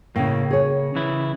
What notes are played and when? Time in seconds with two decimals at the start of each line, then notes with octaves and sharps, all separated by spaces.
0.16 A2 C#3 A#3
0.51 G#4 C#5
0.95 C#3 E3 E4